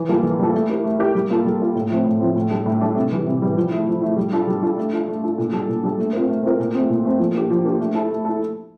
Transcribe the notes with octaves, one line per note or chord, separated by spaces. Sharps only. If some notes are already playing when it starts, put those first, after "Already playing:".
Already playing: E3
G3 A#3 F4 A4
E3
G3 A#3 F4 A4
A3
E4 G4 A#4
A3
E4 G4 A#4
G3
A#3 F4 A4
G3
A#3 F4 A4
A2
F3 A3 C4
A2
F3 A3 C4
A2
G3 D4 A4
A2
G3 D4 A4
C3
E3 G3
C3
E3 G3
F3
A3 E4
F3
A3 E4
G3
D4 F4 A4
G3
D4 F4 A4
A3
D4 F4 A4
A3
D4 F4 A4
A#2
G3 D4 A4
A#2
G3 D4 A4
A3
C4 F4 A#4
A3
C4 F4 A#4
A#2
A3 C4
A#2
A3 C4
F3
A#3 D4 G4
F3
A#3 D4 G4
A3
E4 A4
A3
E4 A4